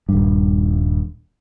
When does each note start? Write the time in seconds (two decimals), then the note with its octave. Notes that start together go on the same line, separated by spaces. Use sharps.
0.09 D#1 G2